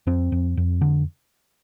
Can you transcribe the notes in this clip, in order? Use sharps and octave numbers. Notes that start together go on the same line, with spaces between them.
F2 C4
F2
F2
D3